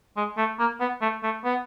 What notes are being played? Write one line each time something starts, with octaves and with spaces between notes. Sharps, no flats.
G#3
A3
A#3
B3
A3
A3
B3